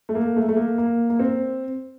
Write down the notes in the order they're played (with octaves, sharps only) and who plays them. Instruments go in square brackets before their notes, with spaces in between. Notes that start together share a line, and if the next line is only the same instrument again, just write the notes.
[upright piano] A3
A#3
A3
A3
A#3
A#3
A#3
C4